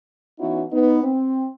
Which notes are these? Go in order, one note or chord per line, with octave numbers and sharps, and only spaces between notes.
E3 B3 C#4 D#4 E4 F#4
B3 D#4
C4